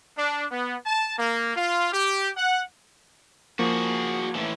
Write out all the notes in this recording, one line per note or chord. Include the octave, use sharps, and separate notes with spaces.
D4
B3
A5
A#3
F4
G4
F#5
F3 A#3 F#4 G#4
A2 E3